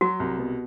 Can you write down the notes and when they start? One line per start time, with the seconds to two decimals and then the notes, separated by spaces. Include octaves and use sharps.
0.01 F#3 F#4
0.20 C2
0.39 B2